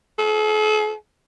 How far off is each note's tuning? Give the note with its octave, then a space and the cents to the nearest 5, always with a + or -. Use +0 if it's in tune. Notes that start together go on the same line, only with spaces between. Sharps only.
A4 -45